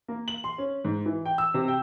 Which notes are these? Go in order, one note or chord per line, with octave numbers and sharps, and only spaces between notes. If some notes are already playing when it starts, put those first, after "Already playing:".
A#3
F#7
C6
C#4
G#2
E3
G5
E6
C3
G5